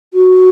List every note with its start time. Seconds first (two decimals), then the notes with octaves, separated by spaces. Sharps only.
0.14 F#4